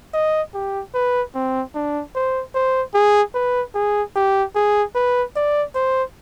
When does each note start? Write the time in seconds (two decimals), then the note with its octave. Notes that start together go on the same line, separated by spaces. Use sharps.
0.14 D#5
0.54 G4
0.94 B4
1.34 C4
1.75 D4
2.15 C5
2.54 C5
2.94 G#4
3.34 B4
3.74 G#4
4.16 G4
4.55 G#4
4.95 B4
5.36 D5
5.75 C5